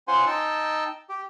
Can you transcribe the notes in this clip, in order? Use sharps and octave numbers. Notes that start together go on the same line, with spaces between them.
C#4 F4 C5 F#5 G#5 C6
D#4 G5 A5 E6
G4